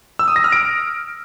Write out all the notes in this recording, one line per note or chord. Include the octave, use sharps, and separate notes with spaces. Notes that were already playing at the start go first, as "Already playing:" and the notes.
E6
D#6
A#6
F6
D7